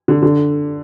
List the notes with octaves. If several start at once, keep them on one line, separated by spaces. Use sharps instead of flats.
D3
D3